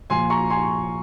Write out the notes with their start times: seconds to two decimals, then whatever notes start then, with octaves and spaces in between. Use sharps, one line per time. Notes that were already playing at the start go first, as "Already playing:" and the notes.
0.10 A#2 F3 G#5 C6
0.30 A#5 C#6
0.50 G#5 C6